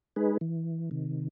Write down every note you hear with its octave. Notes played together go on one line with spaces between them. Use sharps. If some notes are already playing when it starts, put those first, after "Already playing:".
G#3 D#4 G#4 B4
E3
C3 D#3